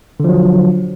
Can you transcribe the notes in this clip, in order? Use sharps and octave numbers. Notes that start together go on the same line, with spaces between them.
D3 F3 F#3